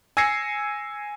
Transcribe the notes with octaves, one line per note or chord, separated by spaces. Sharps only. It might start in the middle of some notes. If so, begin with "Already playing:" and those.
G#5 E6 G#6 A#6 C7 C#7